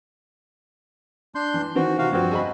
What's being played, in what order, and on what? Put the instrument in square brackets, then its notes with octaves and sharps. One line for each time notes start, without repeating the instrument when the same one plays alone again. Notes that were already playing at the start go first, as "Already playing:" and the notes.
[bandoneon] D4 C6 G6
[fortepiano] E3
[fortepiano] D#3 E3 C4 [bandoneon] F#4
[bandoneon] C3 F#4 F5
[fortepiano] G2 F3 [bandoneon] C4 F#4
[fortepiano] G#4 D#5 B5